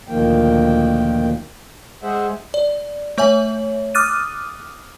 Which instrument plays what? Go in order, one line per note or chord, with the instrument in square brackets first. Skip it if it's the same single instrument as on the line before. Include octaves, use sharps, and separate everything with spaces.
[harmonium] D2 A#2 D#3 F3 A#3 G5
G#3 G#4 C5 E5 F#5
[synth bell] D5
A3 C#5 E5 G#5 F#7
D6 D#6 F6 F#6 A6 D#7